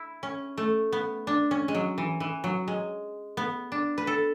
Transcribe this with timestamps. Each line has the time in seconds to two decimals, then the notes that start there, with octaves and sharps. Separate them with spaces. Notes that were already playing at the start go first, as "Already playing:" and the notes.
Already playing: E4
0.23 C#4
0.58 A3
0.93 B3
1.27 D4
1.51 C#4
1.68 G#3
1.75 F#3
1.98 E3
2.20 E3
2.44 F#3
2.68 G#3
3.37 B3
3.72 D4
3.98 B4
4.07 A4